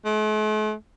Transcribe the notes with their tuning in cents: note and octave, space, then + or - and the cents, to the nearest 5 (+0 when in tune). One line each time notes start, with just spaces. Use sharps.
A3 -45